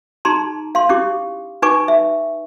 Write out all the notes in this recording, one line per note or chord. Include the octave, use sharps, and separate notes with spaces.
D#4 G#4 A5 A#5 C6
F5 C6
C#4 E4 G4 D6
D#4 B4 G#5 C#6 D6
E5